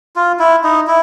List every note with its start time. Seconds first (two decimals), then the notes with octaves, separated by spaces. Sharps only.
0.16 F4
0.39 E4
0.64 D#4
0.87 E4